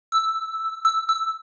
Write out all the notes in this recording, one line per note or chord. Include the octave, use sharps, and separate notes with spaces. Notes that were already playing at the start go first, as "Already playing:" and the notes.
E6
E6
E6